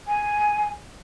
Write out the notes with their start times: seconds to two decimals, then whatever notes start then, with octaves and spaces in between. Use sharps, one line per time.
0.08 G#5